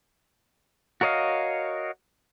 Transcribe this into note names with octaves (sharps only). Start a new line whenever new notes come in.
F#4 A#4 C#5 D#5 F5